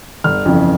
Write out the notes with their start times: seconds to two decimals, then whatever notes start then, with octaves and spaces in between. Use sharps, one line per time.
0.24 G1 F6
0.46 F2 C#3 E3